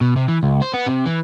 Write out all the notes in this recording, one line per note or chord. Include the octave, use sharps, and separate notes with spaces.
B2
C3
E3
C#2
C5
B3
C3
E3